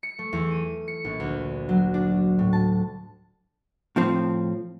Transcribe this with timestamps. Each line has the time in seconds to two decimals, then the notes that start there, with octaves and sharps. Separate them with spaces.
0.03 C#7
0.19 A3
0.33 E2
0.51 D#7
0.88 C#7
1.05 A#1
1.20 D2
1.69 F#3
1.94 D4
2.39 A2
2.53 A5
3.96 A2 F3 C4